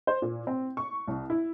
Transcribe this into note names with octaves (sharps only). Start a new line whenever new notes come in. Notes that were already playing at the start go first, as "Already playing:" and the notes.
C5
A#2
C4
C#6
C2
E4